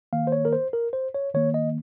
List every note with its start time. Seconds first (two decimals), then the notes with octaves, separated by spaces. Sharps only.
0.13 D#3 A#3 F5
0.27 C5
0.32 C#5
0.45 A#4
0.53 C5
0.73 A#4
0.93 C5
1.14 C#5
1.34 D#3 A#3 C#5
1.54 D#5